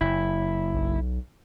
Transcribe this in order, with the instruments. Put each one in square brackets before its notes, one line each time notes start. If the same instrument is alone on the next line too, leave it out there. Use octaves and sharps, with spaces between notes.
[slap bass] F#1 [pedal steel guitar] E4
[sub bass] B1